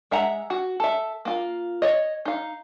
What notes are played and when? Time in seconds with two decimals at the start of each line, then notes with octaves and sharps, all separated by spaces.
0.11 G#3 E5 F#5 A#5
0.50 F#4
0.80 A4 E5
1.25 A#3 F4
1.82 C#5 D#5
2.25 D#4 F5